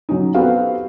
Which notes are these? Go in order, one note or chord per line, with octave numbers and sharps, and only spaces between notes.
F#3 C#4 D#4
B3 C4 F#4 G4 A4 F5